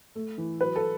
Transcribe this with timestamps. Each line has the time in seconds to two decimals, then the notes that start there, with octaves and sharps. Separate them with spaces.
0.15 A3
0.38 E3
0.60 F#3 B4
0.76 A4